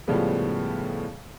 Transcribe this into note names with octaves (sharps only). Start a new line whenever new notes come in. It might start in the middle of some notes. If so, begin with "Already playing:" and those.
A2 C#3 F3 G3 G#3 B3